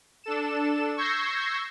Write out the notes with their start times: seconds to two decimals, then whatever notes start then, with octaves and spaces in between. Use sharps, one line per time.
0.24 D4 A4 E7
0.96 C#6 E6 G6 G#6 A#6 C7